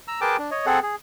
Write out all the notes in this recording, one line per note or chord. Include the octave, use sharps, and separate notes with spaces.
A#5 E6
G#4 A#4 B4 G5 A5 D6
D4
C#5 D#5
C4 G#4 A4 F#5
G#4